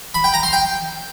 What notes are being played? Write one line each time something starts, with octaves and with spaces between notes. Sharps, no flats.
B5
G5
A#5
C6
G5